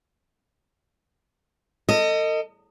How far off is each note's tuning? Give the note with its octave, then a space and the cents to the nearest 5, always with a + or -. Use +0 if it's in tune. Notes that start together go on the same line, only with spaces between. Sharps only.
A4 +40 D#5 +0